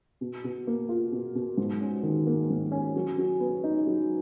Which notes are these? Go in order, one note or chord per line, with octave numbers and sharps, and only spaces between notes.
B2
B2
A#3
F4
B2
B2
G#2
C#4
D#3
A#3
G#2
C#4
F#3
F#3
B3
D#4
F#3